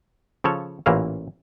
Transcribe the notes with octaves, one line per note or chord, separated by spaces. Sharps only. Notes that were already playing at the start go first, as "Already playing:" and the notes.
C#3 F3 A4 C#5
A1 A#2 E3 A#3 C#4 F5